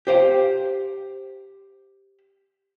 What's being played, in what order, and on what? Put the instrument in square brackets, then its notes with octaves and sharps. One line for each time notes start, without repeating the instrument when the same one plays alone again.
[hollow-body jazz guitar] G4 C5 F5 G5